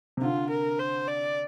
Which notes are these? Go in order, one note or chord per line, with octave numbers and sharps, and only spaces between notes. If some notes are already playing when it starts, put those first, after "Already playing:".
C3
D3 F4
A#4
C5
D5